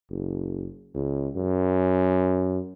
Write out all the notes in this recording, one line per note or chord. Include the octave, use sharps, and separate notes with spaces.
F#1
C#2
F#2